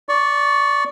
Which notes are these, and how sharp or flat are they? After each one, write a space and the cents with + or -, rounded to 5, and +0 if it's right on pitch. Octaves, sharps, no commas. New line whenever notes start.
D5 -15 C#6 +0